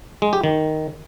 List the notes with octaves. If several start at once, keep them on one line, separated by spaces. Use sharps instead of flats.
G#3
G4
D#3